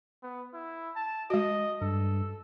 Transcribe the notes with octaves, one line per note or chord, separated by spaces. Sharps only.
B3
E4
A5
G#3 F#4 D#5
G2 A4